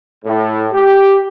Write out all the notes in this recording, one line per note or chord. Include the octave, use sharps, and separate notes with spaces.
A2
G4